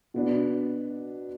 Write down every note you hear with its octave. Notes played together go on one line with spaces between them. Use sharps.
B2 B3 D4